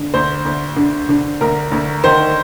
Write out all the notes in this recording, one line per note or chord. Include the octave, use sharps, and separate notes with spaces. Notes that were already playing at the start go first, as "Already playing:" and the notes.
Already playing: D3
D2 C5
D2
D3
D3
D2 A#4
D2
D#3 C5